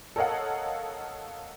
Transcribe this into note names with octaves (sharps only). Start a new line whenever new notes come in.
A4 A#4 C#5 D#5 F5 F#5